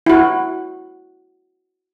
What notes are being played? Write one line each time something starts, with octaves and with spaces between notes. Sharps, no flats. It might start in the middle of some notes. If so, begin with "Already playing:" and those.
E4 F#4